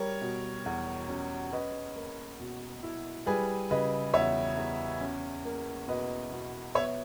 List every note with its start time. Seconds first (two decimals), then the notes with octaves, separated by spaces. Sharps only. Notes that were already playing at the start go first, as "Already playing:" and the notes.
Already playing: G3 A#4 C#5
0.22 B2
0.66 E2
1.09 C#4
1.52 C#4 B4 D#5
1.96 A#3
2.39 B2
2.83 E4
3.26 G3 G#4 B4
3.71 C#3 B4 D#5
4.13 E2 C#5 E5
4.57 E2
5.01 C#4
5.45 A#3
5.88 B2 B4 D#5
6.32 B2
6.75 B3 C#5 E5